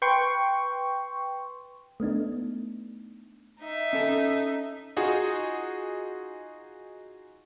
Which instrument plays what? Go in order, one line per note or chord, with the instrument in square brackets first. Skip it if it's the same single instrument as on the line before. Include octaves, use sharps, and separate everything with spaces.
[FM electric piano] B4 G5 C6 C#6
[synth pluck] A3 B3 D4 D#4
[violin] D#4 E5
[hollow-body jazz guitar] C#4 A4 A5
[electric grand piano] D#4 F4 F#4 G#4